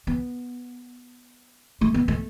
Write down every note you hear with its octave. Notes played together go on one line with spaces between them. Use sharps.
B3
A3
B3
A3